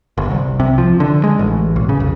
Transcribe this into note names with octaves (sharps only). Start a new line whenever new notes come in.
G1
C2
C3
F3
D3
G#3
A1
B1
C#3
F1